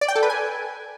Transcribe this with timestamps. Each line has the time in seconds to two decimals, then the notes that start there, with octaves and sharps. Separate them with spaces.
0.01 D5
0.08 G5
0.16 A4
0.23 B4
0.30 G#5